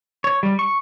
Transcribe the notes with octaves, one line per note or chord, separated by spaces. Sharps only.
C#5
G3
C#6